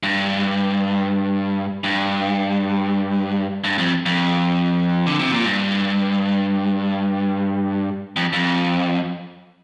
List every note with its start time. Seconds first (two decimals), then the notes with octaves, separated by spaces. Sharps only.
0.03 G2
1.84 G2
3.64 G2
3.78 F2
4.06 F2
5.07 D3
5.19 C3
5.32 A#2
5.45 G2
8.16 F2
8.33 F2